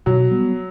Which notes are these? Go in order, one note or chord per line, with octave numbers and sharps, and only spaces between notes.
B2 F#3
G3 B3